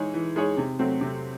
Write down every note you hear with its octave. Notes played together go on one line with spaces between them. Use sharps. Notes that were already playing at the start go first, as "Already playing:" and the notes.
Already playing: E3 G#3 D#4 G#4 C#5
E3
G#3 D#4 G#4 C#5
C3
F#3 A3 C4
C3